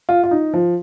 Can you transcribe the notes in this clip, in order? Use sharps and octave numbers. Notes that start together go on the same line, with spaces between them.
F4
F4
D#4
F3